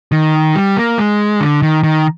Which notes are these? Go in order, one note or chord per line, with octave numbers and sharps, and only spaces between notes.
D#3
G3
A#3
G#3
D3
D#3
D#3